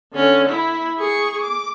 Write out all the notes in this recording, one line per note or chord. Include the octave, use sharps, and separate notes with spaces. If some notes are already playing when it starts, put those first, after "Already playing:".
D3 C#4
E4
G#4 C#6
D6